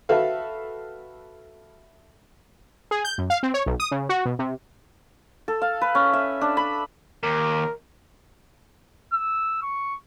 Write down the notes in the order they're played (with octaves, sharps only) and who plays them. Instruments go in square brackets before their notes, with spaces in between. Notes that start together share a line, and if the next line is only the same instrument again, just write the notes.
[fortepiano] F#4 A4 B4 E5 F5
[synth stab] G#4
G6
F#2
F5
C4
C#5
B1
D#6
C#3
F#4
B2
C3
[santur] A4
F5
B4
C#4
E5
D4
B5
[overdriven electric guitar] D#2 [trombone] A#4
[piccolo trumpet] E6
C#6